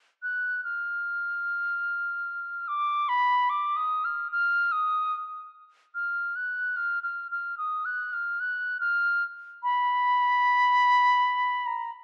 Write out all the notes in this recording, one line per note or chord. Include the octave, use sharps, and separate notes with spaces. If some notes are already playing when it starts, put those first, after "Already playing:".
F#6
F6
D6
B5
D6
D#6
F6
F6
D#6
F6
F#6
F6
F6
F6
D#6
F#6
F6
F#6
F6
B5
A#5